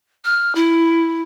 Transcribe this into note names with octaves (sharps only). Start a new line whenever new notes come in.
F6
E4